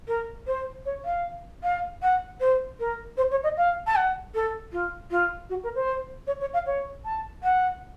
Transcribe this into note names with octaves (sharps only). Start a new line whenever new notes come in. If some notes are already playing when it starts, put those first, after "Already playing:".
A#4
C5
C#5
F5
F5
F#5
C5
A#4
C5
C#5
D#5
F5
A5
F#5
A4
F4
F4
F#4
A#4
C5
C#5
C#5
F5
C#5
A5
F#5